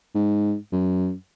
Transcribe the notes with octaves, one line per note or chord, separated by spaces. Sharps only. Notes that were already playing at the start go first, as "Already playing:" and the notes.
G#2
F#2